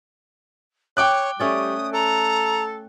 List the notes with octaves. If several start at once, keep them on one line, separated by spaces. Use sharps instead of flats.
C#5 G5 D6 F#6
G3 A3 C#4 D5 D#6
A4 A#5